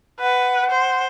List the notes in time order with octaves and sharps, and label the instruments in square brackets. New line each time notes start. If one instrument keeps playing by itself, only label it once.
[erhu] B4 [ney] F#5
[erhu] C5